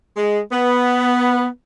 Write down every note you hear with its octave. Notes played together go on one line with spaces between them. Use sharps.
G#3
B3